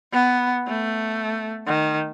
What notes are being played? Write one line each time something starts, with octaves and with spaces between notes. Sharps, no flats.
B3
A3
D#3